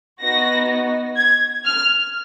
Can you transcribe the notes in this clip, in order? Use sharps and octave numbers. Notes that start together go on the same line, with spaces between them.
B3 D#4 F#4 A#6
G#6
F6